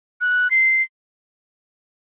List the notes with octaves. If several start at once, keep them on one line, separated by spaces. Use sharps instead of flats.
F#6
C7